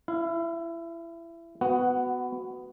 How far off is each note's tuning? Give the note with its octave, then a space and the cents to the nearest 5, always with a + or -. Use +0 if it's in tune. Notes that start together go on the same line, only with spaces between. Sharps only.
E4 +25 F5 -15
B3 +15 F#4 +0 F#5 +0